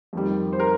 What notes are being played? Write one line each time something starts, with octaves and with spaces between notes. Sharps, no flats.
F2 D#3 G3
C5
A#4